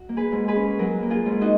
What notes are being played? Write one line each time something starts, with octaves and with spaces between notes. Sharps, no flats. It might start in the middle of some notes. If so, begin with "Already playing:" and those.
Already playing: F#4
A#3
G#4 B4
G#2
G#4 B4
C#4
F#3 F#4 A#4
A#3
F4 G#4
G#2
D#4 F#4